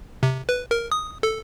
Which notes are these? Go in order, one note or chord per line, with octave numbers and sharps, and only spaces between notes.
C3
B4
A#4
D#6
A4